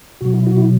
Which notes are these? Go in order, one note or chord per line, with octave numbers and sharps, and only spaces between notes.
B2 F#3 F#4
E4
F#4
E4